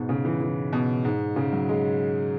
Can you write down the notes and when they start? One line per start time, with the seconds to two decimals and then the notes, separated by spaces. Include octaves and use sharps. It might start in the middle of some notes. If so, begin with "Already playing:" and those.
Already playing: G#2 B2
0.09 C#3
0.25 E3
0.41 E3
0.73 B2
1.05 G#2
1.36 C#3
1.53 F#3
1.69 G#3